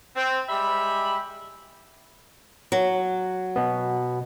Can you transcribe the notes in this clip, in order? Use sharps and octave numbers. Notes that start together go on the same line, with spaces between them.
C4
G3 G#3 E5 B5
F#3
B2 B3